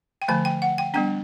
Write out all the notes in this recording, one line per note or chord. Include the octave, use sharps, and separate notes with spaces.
G5
D3 F3 A3 G#5
G5
F#5
G5
G3 B3 D4 G5